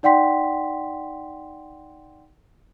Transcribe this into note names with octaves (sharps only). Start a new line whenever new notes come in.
D#4 D5 F#5 G5 C6 B6